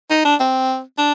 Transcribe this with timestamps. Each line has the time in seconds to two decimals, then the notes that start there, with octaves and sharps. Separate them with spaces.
0.11 D#4
0.25 D4
0.40 C4
0.98 D4